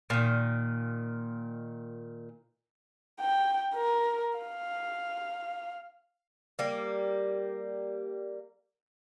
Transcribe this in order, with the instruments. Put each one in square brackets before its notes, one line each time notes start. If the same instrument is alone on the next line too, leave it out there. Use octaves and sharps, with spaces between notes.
[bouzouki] A#2 D#3
[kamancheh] G5
A#4
F5
[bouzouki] G3 A#3